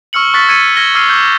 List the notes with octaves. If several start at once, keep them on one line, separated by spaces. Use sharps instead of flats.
C#6 E6 F6 C#7 F#7
C#6 F#6 A6 B6
E6 G#6 C#7 D#7
E6 G#6 A#6 G7
D6 E6 F6 G#6 C7 D#7
D6 G6